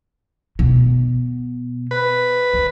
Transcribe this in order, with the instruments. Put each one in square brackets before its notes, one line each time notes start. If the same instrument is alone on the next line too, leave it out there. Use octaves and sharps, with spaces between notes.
[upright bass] B2
[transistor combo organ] B4
[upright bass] D3